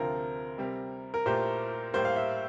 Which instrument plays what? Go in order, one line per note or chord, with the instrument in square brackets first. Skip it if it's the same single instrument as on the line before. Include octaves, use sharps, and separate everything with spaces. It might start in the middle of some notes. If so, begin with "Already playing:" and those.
Already playing: [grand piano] D2 C3 F3 C4 F4 [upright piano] A#4
[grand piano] C3 G3 C4
[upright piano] A#4
[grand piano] A#2 A3 E4 G4 [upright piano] C5
[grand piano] A2 G3 A#3 [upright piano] C5
[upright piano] F5
E5